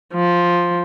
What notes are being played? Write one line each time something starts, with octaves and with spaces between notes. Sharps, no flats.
F3